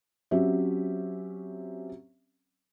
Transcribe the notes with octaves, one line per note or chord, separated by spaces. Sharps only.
F#3 C4 C#4 G4 E5